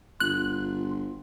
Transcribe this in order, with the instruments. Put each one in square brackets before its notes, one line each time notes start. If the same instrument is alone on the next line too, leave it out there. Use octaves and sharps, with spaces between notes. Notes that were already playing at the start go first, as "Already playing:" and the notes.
[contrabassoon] G1 [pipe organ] F4 [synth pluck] F#6